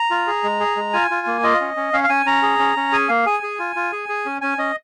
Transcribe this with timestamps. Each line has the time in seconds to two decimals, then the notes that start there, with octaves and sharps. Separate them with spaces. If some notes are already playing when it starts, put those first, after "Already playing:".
Already playing: A#5
0.11 F4
0.27 G#4
0.44 G#3
0.60 G#4
0.77 G#3
0.93 F4 G#5
1.11 F4
1.27 A#3
1.43 F4 D#5
1.61 C#4
1.77 C#4
1.93 C#4 F5
2.04 F5
2.09 C#4 G#5
2.26 C#4 A#5
2.43 G#4
2.59 C#4
2.77 C#4
2.92 G#4 G#5
3.09 A#3 F5
3.26 G#4 G#5
3.43 G#4
3.59 F4
3.76 F4
3.92 G#4
4.09 G#4
4.26 C#4
4.41 C#4 G#5
4.58 C#4 D#5